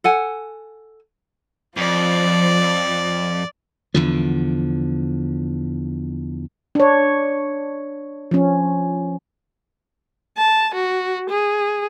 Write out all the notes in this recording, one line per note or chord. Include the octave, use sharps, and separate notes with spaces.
A4 F#5 G#5
F2 F3 D5
E2 D3 F3
D4 C#5
F3 C#4
A5
F#4
G#4